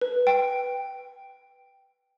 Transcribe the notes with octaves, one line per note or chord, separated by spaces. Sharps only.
B4
G5